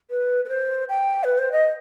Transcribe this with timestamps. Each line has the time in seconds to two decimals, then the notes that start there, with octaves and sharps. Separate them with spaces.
0.10 B4
0.45 B4
0.49 C5
0.89 G5
1.24 B4
1.38 C5
1.52 D#5